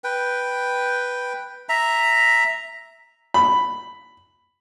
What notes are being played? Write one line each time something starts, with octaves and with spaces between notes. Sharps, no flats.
B4 G5
E5 A#5
B5